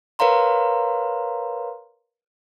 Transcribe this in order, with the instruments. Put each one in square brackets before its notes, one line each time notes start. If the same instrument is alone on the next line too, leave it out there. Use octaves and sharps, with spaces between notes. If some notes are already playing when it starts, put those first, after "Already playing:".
[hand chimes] A#4 B4 C#5 F5 A#5 C6